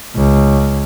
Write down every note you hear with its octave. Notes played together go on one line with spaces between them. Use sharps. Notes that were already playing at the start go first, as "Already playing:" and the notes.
C#2